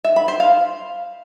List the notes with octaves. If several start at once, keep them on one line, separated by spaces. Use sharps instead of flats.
E5
B5
C5
F5